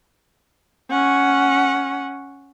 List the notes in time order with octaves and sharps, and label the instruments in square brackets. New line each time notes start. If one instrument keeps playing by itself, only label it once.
[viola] C#4 F#5